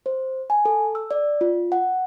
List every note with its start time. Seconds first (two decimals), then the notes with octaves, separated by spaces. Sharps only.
0.06 C5
0.50 G#5
0.65 A4
0.95 E6
1.11 D5
1.41 F4
1.72 F#5